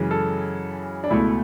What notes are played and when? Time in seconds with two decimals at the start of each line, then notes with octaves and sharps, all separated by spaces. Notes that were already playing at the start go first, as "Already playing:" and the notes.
Already playing: F#2 C#3 E3 G#3
0.11 A4
1.04 D4
1.10 C#2 B2 A3 E4